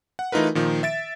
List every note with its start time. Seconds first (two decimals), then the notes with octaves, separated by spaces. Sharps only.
0.19 F#5
0.32 E3 A3 D#4 F4 A#4 B4
0.55 A#2 D#3 F3
0.83 E5 A6 D7